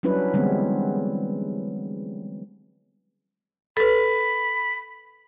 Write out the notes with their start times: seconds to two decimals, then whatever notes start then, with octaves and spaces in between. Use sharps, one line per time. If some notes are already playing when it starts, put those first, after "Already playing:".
0.03 F#3 G3 C#4 D4 E4 B4
0.33 D3 E3 G3 G#3 B3 C4
3.77 A4 B4 B5